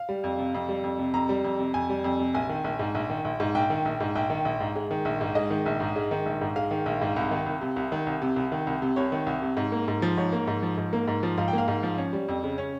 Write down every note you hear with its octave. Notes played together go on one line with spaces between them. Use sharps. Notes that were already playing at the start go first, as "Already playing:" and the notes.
Already playing: F5
G3
F2
C3
F2
G3
F2
C3
F2 A#5
G3
F2
C3
F2 G#5
G3
F2
C3
A#1 G#5
D#3
A#1
G#2
A#1
D#3
A#1
G#2
A#1 G5
D#3
A#1
G#2
A#1 G5
D#3
A#1
G#2
G#3
D#3
A#1
G#2
G#3 D#5
D#3
A#1
G#2
G#3
D#3
A#1
G#2
G#3 F5
D#3
A#1
G#2
C2
D#3
C2
C3
C2
D#3
C2
C3
C2
D#3
C2
C3
C2 C#5
D#3
C2
C3
G#2
A#3
G#2
F3
G#2 C#5
A#3
G#2
F3
G#2
A#3
G#2
F3
G#2 F5
G5
A#3
F5
G#2
F3
C#4
G3
F2
C#3
C#4